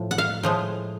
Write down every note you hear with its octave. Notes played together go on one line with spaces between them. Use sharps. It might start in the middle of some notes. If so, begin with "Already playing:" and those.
Already playing: A2 F3
F#5
F5
A2 F3 G#3